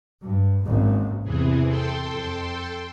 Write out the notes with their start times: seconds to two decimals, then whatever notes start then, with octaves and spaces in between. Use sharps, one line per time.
0.23 G2
0.63 G#1 A#2 C#3
1.23 E2 C3 E3 G#4
1.67 A4 G5 C6
2.08 F2